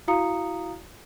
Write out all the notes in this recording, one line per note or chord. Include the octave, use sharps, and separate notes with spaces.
E4 F#4 F5 A#5 D#6 C#7